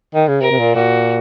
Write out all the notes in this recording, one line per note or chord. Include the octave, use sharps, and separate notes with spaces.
D#3
C#3
C3 A#4
C3
A#2
A#2 F#4